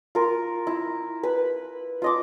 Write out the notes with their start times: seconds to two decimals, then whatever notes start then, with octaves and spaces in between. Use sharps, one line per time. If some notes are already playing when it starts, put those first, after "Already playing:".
0.15 F4 A#4
0.67 E4
1.23 B4 B5
2.02 F4 D#5 D6